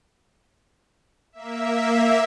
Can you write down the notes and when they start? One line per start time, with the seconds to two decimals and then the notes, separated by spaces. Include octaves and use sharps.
1.33 A#3 E5